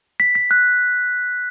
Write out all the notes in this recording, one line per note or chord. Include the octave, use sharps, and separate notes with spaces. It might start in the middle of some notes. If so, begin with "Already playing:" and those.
B6
B6
F#6